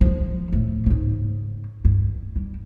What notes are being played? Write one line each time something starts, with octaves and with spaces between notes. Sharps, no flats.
F3 G#3
A2 A3
G#2 C#3
G2
G3